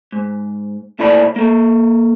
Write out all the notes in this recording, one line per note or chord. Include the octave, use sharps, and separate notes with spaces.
G#2
C2 A#2 E4 A4 D5 B5
A#3 A4